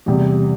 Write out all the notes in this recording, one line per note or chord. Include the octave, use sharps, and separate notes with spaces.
E2 C3 G3